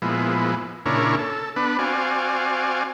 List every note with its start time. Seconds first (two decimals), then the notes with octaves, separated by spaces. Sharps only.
0.02 A#2 F3 G#3 B3 E4
0.86 A#2 C#3 D4 E4 A#4 C#5
1.19 A4
1.56 B3 D4 B4
1.79 C4 F#4 D5 F5 G#5